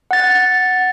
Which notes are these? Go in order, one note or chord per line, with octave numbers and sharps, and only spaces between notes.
F#5 A6